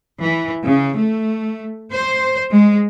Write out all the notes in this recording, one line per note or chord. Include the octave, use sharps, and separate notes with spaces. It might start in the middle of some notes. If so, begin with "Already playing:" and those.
E3
C#3
A3
C5
G#3